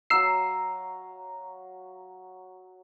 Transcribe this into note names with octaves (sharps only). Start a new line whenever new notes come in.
F#3 F5 A#5 E6 C7